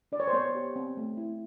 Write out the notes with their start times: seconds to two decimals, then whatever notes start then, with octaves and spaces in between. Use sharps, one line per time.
0.12 D4 D5
0.20 C#5
0.27 C5
0.33 B3 C#5
0.55 G4
0.76 C4
0.97 A3
1.17 E4